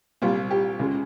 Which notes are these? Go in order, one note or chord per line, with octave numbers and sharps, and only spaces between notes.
C2 A#2 G3 F4
G4
C#2 C#3 G#3